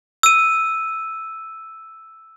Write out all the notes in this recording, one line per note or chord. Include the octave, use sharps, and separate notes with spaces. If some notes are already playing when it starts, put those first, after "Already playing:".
E6 D#7